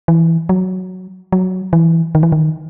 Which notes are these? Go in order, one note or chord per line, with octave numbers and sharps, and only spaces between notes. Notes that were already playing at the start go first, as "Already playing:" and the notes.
E3
F#3
F#3
E3
D#3
E3
D#3